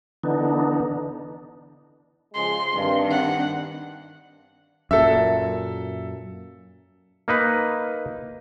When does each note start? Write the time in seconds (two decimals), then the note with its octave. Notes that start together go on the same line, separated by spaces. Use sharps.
0.23 D3 E3 B3 D4 D#4
2.34 C#3 F3 G#3 C6
2.73 G2 D#3 C4 D4
3.11 F#5
4.91 F#2 A#2 A4 E5
7.28 A#3 D#4 B4